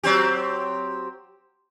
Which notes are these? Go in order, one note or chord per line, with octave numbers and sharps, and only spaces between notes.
F#3 C4 G4